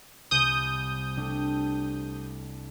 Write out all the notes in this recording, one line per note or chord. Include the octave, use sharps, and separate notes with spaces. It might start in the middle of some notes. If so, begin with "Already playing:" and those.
C2 D#6 G6
A3 D4 G4